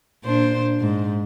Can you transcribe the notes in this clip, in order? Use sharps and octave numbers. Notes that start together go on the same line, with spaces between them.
A#2 D4 C5
G#2